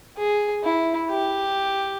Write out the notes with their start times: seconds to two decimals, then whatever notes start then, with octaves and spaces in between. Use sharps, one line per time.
0.18 G#4
0.64 E4
1.11 G4